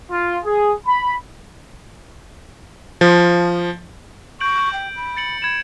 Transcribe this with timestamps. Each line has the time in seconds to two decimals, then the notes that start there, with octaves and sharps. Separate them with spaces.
0.11 F4
0.45 G#4
0.87 B5
3.01 F3
4.41 C#6 G6 D7 F#7
4.73 G5
4.96 B5
5.17 A6 C#7 F#7
5.42 B5 G#6 E7